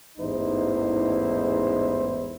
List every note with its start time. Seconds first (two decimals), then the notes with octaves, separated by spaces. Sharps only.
0.18 A1 E2 G#2 D#4 E4 C5